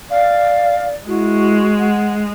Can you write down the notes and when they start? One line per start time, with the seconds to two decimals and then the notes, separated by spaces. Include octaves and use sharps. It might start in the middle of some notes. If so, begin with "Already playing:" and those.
0.10 D5 F5
1.07 G#3 E4 F#4
1.79 F#5